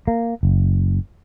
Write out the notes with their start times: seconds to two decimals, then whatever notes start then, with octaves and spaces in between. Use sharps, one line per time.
0.08 A#3
0.43 F#1